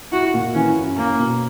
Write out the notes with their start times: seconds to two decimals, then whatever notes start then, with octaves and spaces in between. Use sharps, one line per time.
0.12 E4 F#4
0.34 A#2
0.55 E3 C#4
0.77 F#2
0.98 A#3 C#4
1.19 B2